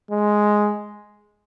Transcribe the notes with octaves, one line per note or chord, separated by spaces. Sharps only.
G#3